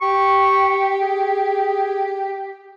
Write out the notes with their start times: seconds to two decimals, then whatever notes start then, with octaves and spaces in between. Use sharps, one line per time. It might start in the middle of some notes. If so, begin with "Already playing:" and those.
0.02 G4 C#6
1.01 G#4